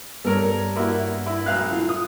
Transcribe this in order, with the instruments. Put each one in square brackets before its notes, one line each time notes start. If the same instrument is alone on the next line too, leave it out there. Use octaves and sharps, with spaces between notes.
[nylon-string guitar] G2 G3 B3 [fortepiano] A4 A#4 C#5
[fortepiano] A#3 E4 F#4
E4
B1 F5 F#6
[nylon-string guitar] E4 F4
[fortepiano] D#6